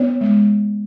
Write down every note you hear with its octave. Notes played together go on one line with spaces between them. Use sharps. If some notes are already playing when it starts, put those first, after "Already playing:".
Already playing: B3 C#5
G#3